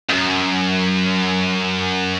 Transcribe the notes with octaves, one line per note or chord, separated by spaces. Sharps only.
C#2 F#2